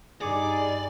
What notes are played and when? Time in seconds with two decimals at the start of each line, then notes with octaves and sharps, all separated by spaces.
0.21 G2 G3 D#4 G#4 D5 D6 C#7